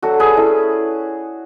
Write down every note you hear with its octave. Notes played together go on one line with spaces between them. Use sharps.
F#3 A3 D4 F#4 A4
G#4 B4
A3 C#4 E4